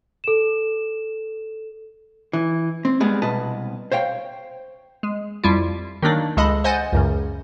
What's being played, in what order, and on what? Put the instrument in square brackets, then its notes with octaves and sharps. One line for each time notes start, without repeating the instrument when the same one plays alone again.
[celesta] A4 E7
[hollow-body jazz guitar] E3
C4
G3 G#3 B3
C2 B2 B4 D#5 A5
C5 C#5 F5 G5
[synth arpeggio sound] G#3
F2 G3 E4 F4
D#3 F#3 A#3 D4 D#4
C#2 G#3 A4 D#5 B5
C5 D#5 F#5 G#5 G6 A6
C#2 F#2 C#3